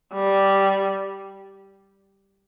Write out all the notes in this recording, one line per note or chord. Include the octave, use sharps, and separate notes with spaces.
G3